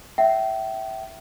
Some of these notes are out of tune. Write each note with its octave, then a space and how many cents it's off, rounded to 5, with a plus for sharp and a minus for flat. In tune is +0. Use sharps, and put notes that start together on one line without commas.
E5 +0 G5 -30